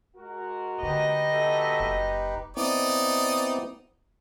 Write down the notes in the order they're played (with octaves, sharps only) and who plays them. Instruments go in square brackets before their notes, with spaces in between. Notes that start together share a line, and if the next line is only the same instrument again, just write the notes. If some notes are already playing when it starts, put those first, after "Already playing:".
[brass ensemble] G#3 F#4 A#4
[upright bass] D3 [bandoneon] D#4 G4 B4 [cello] D#5
[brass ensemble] F#4 A4 E5
[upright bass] F#1
[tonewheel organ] B3 C4 E4 [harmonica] D#4 D5 D#6